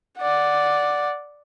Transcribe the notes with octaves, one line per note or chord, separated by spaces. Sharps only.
D5 F#5